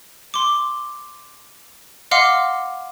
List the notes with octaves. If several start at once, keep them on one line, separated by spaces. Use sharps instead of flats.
C6 D6
D#5 F5 F#5 C6 D6 F6